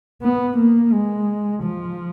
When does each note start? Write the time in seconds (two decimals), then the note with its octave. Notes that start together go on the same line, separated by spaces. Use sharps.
0.23 B3
0.58 A#3
0.92 G#3
1.63 F3